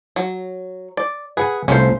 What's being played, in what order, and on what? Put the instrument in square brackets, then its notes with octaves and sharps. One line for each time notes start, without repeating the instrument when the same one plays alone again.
[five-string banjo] F#3
D5
[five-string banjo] G#4 [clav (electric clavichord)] B4 F#5 G#5
[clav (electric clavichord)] C2 A3 F4 [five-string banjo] C#4 C5